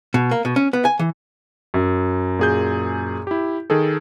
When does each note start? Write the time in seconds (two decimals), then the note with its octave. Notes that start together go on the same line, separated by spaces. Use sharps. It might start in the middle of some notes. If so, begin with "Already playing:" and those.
0.14 B2
0.31 A#3
0.45 B2
0.56 C#4
0.73 B3
0.85 G#5
0.99 E3
1.74 F#2
2.39 A#2 G#4 G6
3.27 E4 G4
3.70 D#3 G#4 A4